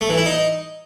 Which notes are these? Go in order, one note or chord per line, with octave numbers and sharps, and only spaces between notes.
A3
E3
E4
D#4